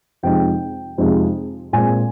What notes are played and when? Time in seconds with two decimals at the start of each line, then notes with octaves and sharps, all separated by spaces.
0.23 F2 C3 F3 G#3 D#4 G5
0.98 F2 C3 F3 G#3 D#4
1.73 A#2 G#3 C4 G#5